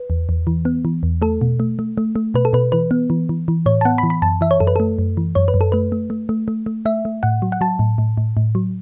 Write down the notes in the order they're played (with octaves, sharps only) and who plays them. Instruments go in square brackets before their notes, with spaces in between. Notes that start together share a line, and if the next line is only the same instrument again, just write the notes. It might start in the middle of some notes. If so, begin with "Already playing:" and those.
Already playing: [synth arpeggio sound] B4
E2
E2
E3
B3
E3
E2
A3 A4
B2
A3
A3
A3
A3
B2 B4
A4
B2 B4
E3 B4
B3
E3
E3
E3
A2 C#5
A5
B3 F#5
B5
E3
B5
F#2 A5
E3 E5
C#5
F#2 A4
B4
A3 A4
F#2
E3
F#2 C#5
B4
F#2
A4
A3 B4
A3
A3
A3
A3
A3
A3 E5
A3
A2 F#5
F#3
F#5
F#3 A5
A2
A2
A2
A2
F#3